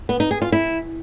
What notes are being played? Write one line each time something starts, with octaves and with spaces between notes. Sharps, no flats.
B3
D#4
G#4
F4
E4